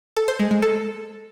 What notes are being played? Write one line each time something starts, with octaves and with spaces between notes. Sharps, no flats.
A4
C5
G#3
G#3
A4